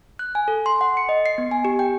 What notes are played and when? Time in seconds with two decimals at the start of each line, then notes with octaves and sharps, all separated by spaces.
0.19 F#6
0.35 G#5
0.48 A4
0.66 C6
0.81 F#5
0.97 C#7
1.09 D#5
1.26 C7
1.38 B3
1.51 G#5
1.65 G4
1.79 G5